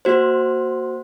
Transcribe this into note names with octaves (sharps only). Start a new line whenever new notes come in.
A#3 F#4 C5